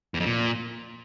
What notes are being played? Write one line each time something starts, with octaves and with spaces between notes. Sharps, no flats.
E2
F2
A#2